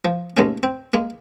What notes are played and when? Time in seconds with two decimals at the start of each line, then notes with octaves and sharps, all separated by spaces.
0.05 F3
0.37 D#2 G#3 A3 C#4
0.63 C4
0.94 G#3 A#3